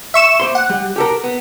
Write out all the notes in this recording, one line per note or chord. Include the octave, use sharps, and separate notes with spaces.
E5 C#6 E7
A#3 C5 C6
F#5
G3
G4 A4 A#4
B3